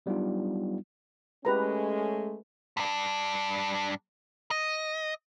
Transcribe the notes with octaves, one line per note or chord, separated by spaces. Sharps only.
F#3 G3 B3 D4 D#4 F4
G#3 A3 C#4 G4 B4 A#5
G2 D4
D#5